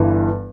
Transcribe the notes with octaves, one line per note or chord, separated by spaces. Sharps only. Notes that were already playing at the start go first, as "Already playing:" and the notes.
Already playing: G1 G2 E3